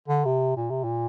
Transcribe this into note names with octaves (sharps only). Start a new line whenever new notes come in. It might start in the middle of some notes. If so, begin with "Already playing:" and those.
D3
C3
A#2
C3
A#2